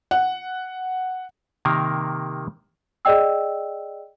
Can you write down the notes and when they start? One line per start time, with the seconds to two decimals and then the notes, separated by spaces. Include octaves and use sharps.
0.11 F#5
1.65 C3 D#3 A#3 A#4
3.05 G#4 D5 D#5 G5 E6